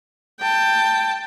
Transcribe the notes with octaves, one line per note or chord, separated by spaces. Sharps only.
G5 A5